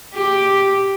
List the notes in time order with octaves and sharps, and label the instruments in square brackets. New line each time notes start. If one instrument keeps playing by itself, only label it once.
[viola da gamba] G4